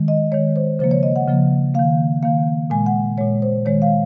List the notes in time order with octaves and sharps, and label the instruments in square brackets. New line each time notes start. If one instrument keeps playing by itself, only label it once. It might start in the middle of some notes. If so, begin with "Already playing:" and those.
Already playing: [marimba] D#3 G#3
D#5
D#3 G#3 C#5
C5
C#3 F3 A#3 C5
C#5
D#5
F#5
C#3 F3 A#3
D#3 A#3 F5
D#3 A#3 F5
A#2 G#3 G#5
F#5
A#2 G#3 C#5
C5
D#3 G#3 C#5
F5